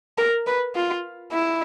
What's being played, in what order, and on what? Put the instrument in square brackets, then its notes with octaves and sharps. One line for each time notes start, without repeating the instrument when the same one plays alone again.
[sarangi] A#4
B4
F4
E4